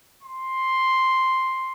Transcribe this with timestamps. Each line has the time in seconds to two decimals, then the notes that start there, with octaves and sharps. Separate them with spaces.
0.23 C6